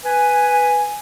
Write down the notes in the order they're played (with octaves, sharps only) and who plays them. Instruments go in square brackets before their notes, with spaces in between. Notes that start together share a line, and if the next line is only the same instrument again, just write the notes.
[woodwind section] B4 G#5